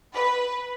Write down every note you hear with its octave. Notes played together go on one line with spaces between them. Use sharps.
B4